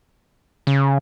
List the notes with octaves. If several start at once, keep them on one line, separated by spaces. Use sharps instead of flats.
C#3